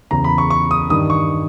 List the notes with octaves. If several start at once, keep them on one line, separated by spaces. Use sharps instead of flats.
E2 C#3 E3 A#5
B5
C#6
C#6
D#6
G2 D#3 D#6
C#6